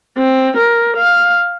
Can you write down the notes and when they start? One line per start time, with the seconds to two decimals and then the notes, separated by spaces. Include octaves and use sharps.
0.18 C4
0.57 A#4
0.97 F5